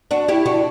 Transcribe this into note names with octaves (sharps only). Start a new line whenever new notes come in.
D4 F#4
E4 G4
D4 F#4